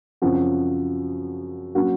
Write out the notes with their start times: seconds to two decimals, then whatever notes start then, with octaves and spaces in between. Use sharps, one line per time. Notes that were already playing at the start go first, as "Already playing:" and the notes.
0.22 F#2 C#3 F3 C4 F#4
1.75 F#3 A#3 C#4 F#4 A#4